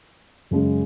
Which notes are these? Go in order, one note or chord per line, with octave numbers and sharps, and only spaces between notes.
F#2 C#3 G#3